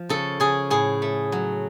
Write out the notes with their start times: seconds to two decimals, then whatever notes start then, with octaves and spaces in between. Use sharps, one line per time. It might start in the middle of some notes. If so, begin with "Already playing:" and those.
Already playing: F3
0.09 C#3 A4
0.40 C#3 G#4
0.70 A2 G#4
1.02 A3
1.32 F#3